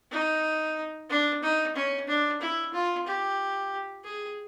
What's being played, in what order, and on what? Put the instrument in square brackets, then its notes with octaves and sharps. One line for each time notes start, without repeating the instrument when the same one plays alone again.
[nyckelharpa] D#4
D4
D#4
C#4
D4
E4
F4
G4
G#4